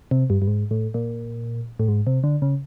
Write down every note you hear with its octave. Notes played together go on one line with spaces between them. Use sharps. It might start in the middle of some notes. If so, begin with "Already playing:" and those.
C3
G2
G2
G#2
A2
A#2
A2
G#2
C3
D3
C#3